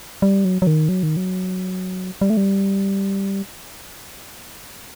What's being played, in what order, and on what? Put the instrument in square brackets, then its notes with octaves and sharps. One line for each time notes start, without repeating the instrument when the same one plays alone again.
[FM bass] G3
F#3
F#3
D#3
F#3
D#3
F#3
G3
A3
G3